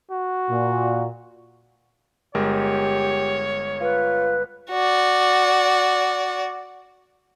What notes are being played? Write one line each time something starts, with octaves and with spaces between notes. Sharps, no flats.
F#4
A#2
G1 G#3 G4 A#4 C#5
F4 B4
F#4 D5